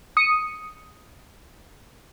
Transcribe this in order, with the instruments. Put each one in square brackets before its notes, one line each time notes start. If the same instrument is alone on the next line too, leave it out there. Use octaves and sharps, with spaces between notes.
[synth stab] D#6 C#7